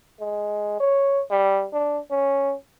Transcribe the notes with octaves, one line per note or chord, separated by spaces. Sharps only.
G#3
C#5
G3
D4
C#4